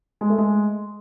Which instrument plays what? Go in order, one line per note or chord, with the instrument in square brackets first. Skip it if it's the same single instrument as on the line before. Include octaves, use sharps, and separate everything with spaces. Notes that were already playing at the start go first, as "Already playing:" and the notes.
[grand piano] G#3
A3
G#3